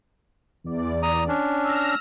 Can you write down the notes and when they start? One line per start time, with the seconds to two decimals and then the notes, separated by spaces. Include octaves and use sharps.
0.64 E2 D5
1.03 A#5 D#6
1.28 C#4 D4
1.64 E6 F6 A#6